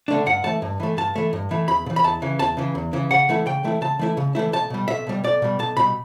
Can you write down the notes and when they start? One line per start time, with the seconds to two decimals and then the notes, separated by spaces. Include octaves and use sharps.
0.08 D3 A3 D4
0.26 G2 F#5
0.44 E3 A3 A5
0.62 G2
0.80 E3 A3
0.97 G2 A5
1.16 E3 A3
1.33 G2
1.51 E3 A3
1.68 E2 B5
1.86 C#3
1.90 E3
1.96 B5
2.04 E2 A5
2.22 C#3 E3
2.39 E2 A5
2.57 C#3 E3
2.75 E2
2.93 C#3 E3
3.11 C#3 F#5
3.29 E3 A3 E4
3.46 C#3 G5
3.64 E3 A3 E4
3.81 C#3 A5
3.99 E3 A3 E4
4.17 C#3
4.35 E3 A3 E4
4.52 B1 A5
4.70 B2 G3
4.88 B1 E5
5.07 B2 G3
5.24 B1 D5
5.42 B2 G3
5.59 B1 A5
5.77 B2 G3 B5